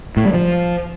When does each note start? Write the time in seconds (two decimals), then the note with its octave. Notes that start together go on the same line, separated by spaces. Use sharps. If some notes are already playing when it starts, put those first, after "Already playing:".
0.17 A2
0.25 G3
0.34 F3